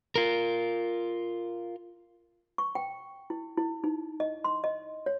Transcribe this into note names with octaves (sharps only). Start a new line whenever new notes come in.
F4 A#4
C#6
G5
E4
E4
D#4
D#5
C6
D#5
C#5